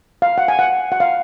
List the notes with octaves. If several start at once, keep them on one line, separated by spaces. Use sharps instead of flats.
F5
F#5
G#5
F#5
F#5
F5